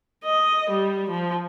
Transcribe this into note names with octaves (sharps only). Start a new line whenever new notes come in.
D#5
G3
F3